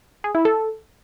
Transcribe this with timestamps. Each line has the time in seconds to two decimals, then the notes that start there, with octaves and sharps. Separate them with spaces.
0.24 G#4
0.35 E4
0.45 A4